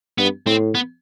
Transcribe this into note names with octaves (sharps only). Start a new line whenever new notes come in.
G2 B3
A2 C4
B3